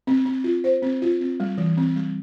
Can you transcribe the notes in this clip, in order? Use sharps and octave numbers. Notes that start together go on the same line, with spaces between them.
C4
C4
F4
C5
C4
F4
C4
G3
E3
C4
G3